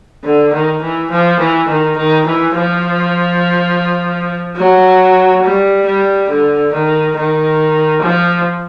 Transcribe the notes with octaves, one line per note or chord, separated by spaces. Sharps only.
D3
D#3
E3
F3
E3
D#3
D#3
E3
F3
F#3
G3
G3
D3
D#3
D#3
F3